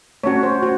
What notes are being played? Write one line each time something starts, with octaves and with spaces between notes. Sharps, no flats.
A3 C#4 F#4 C#5
C5
F#4